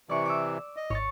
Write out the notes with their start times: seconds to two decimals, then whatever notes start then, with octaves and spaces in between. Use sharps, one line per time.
0.09 C3 E3 D5 C#6
0.25 D6 E6
0.76 D#5
0.90 G#1 C#5 C#6 A6